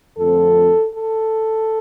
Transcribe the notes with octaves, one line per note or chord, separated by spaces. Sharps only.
F2 D3 F3 A3 C4 A4
A4